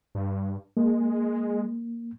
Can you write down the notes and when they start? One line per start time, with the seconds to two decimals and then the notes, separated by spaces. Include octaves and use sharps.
0.15 G2
0.77 G#3 A#3